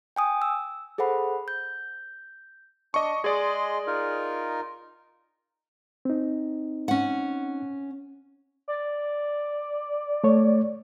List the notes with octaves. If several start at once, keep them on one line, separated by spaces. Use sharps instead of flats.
G5 G#5 D#6
E6
G#4 A4 C5 F#5 B5
G6
D4 D#5 C#6
G#3 G#4 D5 D#5 C6
D#4 F4 A#4
C4 D#4
C#4 F#5
D5
A3 C#5